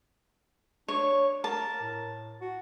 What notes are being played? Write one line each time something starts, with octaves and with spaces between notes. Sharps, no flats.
D4 C#5
A#4 A5
A2
F#4